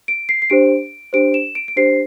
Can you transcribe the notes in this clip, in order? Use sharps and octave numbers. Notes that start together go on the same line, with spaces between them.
D7
C7
C7
D4 G4 C5 D7
D4 G4 C5 D7
E7
D7
D7
D4 G4 C5 C7